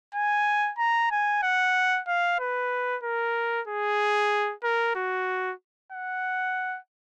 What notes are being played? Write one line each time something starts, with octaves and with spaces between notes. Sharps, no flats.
G#5
A#5
G#5
F#5
F5
B4
A#4
G#4
A#4
F#4
F#5